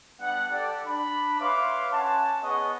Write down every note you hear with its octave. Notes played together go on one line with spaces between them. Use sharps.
G3 B3 D4 F#5
G4 A4 D5
D4 B5
B4 C#5 E5 F5 C6 D6
C#4 F#5 G#5 A5
B3 G#4 C#5 D#5 F#5 C#6